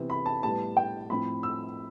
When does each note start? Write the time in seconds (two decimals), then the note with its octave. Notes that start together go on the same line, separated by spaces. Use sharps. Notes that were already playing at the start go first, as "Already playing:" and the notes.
Already playing: C3 E3 B3
0.10 B5
0.26 A5
0.43 A2 G3 B3 A5
0.77 G5
1.10 A2 F3 C4 B5
1.43 E6